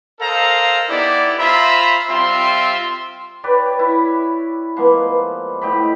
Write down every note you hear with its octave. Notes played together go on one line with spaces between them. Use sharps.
A4 A#4 C5 D#5 F5 A#5
B3 D#4 E4 G4 D5
F4 C5 E5 A#5 B5
G3 C4 F4 E5 C6
G4 B4 C#5 D5
E4
F3 G#3 A#3 B3
A2 G4 D#5 B5